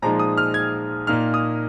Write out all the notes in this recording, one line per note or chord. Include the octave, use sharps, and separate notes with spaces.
A#2 F3 G#3 D#4 A#5
D#6
F6
G#6
A#2 A#3 D#4 F6
D#6